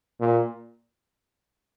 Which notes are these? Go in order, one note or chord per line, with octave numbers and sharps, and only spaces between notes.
A#2